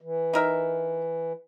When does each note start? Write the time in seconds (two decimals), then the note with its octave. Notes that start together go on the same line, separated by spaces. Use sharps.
0.01 E3
0.33 D#4 A#4 E5